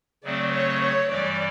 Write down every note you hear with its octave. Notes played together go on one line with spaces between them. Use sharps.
C#3 F#3 A3 C4 D5
C#5
C#5
G2 E3 G3 D5